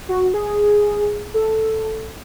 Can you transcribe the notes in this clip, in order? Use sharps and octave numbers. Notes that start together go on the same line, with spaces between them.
F#4
G#4
A4